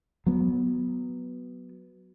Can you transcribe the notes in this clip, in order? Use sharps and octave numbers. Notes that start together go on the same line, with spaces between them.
F#3 B3